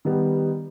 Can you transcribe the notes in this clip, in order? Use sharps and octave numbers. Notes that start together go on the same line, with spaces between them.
D#3 G3 B3